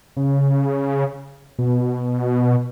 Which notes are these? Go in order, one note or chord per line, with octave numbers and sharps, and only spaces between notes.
C#3
B2